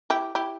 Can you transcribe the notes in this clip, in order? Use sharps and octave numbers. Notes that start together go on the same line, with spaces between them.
E4 G4
E4 G4